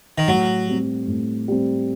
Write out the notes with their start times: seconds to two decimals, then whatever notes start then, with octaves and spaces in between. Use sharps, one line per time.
0.18 D#3
0.28 A2 F#3
0.67 G3 C4
1.08 A2
1.48 G3 C4